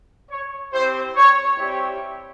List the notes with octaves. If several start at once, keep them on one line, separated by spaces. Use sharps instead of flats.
C#5
C4 E4 G4 C5
C#5
G3 C4 E4 G4 C#5